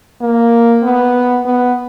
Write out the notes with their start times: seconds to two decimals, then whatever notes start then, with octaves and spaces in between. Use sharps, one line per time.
0.21 A#3
0.83 B3
1.45 B3